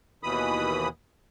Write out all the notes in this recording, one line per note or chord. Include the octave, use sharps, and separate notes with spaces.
D#2 B2 E3 B5 D#6